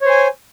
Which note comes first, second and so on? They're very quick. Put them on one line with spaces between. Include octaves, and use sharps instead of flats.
C#5 C5 G#5